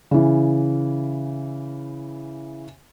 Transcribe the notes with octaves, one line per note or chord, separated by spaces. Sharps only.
C#3 E3